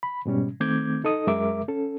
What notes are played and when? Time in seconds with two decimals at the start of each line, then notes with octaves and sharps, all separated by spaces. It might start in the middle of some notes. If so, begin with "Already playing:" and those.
0.03 B5
0.25 G#2 B2 G3 C#4
0.60 D#3 A3 C4 D6 G6 G#6
1.04 D#4 A4 D#5 D#6
1.27 F#2 G#3 A#4 E5 D6
1.68 C#4 A4